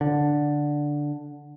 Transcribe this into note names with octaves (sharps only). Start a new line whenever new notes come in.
D3